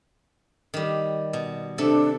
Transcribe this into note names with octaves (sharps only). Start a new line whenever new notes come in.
D#3 G3
B2
C3 D4 A4 D5